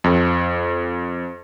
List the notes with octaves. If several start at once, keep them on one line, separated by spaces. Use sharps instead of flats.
F2